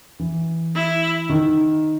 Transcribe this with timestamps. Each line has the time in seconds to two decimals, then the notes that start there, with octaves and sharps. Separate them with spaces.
0.19 E3
0.75 E4
1.30 D#3